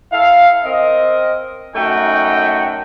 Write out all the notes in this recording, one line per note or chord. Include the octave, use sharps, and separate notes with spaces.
E4 A4 F5
C4 A#4 D#5
F#2 A3 D#4 F#4 G5